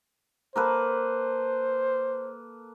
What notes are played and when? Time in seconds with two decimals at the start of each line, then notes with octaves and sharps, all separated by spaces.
0.56 A#3 A4 B4 C5